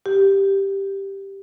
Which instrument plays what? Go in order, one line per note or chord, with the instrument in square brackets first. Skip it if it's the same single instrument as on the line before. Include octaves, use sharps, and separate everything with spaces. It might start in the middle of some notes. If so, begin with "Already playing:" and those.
[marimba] G4